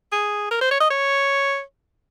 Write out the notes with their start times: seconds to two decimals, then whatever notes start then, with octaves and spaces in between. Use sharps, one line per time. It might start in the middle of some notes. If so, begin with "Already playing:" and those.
0.12 G#4
0.51 A#4
0.61 C5
0.71 C#5
0.80 D#5
0.90 C#5